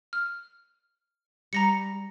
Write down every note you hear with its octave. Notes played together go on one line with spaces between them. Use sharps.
F6
G3 A#5 A#6 C#7